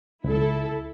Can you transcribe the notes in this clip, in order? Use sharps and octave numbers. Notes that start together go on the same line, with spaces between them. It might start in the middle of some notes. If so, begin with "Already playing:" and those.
C#2 E4 A4